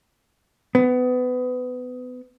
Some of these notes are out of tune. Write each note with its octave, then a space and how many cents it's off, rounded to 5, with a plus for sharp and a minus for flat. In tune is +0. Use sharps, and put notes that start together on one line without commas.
B3 +25